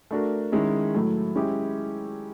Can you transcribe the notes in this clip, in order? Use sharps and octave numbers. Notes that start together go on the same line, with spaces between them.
A3 D4 F#4 A#4
D#3 G#3 C#4 E4
A2 F#3 A3
G#3 C#4 E4 G4